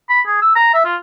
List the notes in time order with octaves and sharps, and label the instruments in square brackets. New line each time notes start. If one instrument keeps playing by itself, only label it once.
[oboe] B5
G#4
E6
A#5
E5
F4